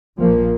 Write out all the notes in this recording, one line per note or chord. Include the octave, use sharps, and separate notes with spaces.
A#1 A#2 F3 A#3